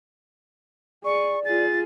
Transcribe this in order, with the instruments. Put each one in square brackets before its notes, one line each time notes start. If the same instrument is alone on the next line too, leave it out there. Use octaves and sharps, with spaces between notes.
[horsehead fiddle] G#4 [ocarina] D5 [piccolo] C#6
[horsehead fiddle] F4 G#4 [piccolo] A6